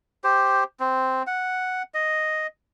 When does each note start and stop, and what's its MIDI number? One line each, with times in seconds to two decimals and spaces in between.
0.24 0.64 67
0.24 0.64 72
0.80 1.23 60
1.27 1.82 78
1.94 2.47 75